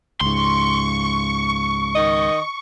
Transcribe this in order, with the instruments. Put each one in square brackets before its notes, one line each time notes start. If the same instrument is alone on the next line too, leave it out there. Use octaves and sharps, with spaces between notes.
[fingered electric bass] C#2 G#2 [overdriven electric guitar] C6 [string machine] C#6
[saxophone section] D#3 D#5